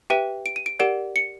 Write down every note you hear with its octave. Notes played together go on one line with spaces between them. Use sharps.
G4 B4 E5 G5 D#7
D7
D#7
D7
G4 A#4 D5 F#5 D7
C#7